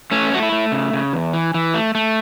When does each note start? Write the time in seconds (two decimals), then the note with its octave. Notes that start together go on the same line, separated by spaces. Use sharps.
0.11 A3 C#4
0.32 A3 F#4
0.43 E4
0.52 A3
0.72 C#3
0.93 C#3
1.13 E2
1.33 E3
1.54 E3
1.74 A3
1.95 A3